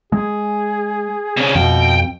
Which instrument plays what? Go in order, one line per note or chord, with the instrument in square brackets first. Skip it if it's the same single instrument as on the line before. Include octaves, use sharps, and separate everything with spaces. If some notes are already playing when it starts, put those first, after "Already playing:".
[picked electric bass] G#3 [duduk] G#4
[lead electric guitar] C3 C#4
[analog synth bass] F2 [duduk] B2 [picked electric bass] F3 [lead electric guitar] G5